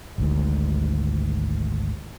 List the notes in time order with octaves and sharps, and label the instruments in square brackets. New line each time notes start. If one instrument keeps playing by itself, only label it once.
[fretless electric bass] G#1 D2 G#2